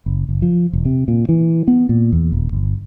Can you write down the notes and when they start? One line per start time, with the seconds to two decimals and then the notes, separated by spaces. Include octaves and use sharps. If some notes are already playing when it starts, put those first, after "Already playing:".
0.06 F#1
0.29 F#1
0.42 F3
0.73 E1
0.85 C3
1.08 A#2
1.29 E3
1.68 B3
1.89 A#2
2.12 E2
2.32 D#1
2.53 G1